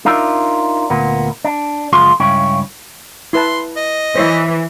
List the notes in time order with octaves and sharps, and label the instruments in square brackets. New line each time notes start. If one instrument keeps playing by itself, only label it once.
[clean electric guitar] D4 D#4 F4 A#4 D5 E5
D2 A#2 A#3 B3
D4
F#2 C#3 F3 G#3 F4 C6
C#2 G2 C#4 E4 C#5 G5
[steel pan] E4 B4 A5 [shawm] C6
[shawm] D#5
[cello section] E3 [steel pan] C5 C#5 E5